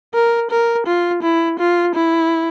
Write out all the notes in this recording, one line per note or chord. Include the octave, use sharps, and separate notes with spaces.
A#4
A#4
F4
E4
F4
E4